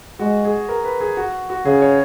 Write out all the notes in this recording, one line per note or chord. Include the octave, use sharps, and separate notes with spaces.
G#3 F#4
G#4
A#4
B4
G#4
F#4
F#4
C#3 G#4
C#5